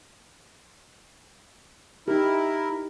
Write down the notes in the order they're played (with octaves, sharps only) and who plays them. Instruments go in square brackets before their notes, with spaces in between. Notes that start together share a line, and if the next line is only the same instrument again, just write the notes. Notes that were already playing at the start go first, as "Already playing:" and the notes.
[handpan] D#4 G4 [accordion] E4 A#4